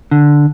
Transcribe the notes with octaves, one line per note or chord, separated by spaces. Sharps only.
D3